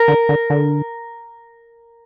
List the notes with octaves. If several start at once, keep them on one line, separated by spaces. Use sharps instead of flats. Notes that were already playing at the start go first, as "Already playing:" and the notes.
Already playing: A#4
D3
D3
D3